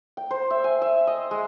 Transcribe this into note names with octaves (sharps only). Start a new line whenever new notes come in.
G5
C5
E5
G#5
E5
D#5
G#3